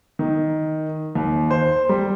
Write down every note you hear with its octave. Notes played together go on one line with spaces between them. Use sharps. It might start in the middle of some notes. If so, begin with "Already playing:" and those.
D#3
D#2
C5
G3